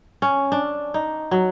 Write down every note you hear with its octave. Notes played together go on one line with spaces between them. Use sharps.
C#4
D4
D#4
F#3